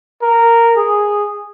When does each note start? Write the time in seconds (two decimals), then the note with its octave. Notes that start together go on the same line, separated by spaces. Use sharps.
0.22 A#4
0.77 G#4